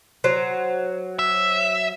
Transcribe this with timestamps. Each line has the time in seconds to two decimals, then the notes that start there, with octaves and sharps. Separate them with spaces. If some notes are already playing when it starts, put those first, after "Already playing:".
0.24 F#3 C5
1.19 E5